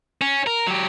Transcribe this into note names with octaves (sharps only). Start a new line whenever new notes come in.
C#4
A#4
F#3 G4